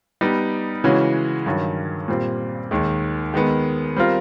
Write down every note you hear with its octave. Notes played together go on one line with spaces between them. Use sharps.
G3 B3 D#4
C#3 E3 G#3 C#4 F#4
G2 D#3 F#3
A#2 G3 C4
D#2 D#3 G#3
D#3 G#3 B3
G3 C4 F4 A#4